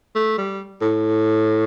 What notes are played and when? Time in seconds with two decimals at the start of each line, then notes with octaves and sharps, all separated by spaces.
0.15 A3
0.38 G3
0.82 A2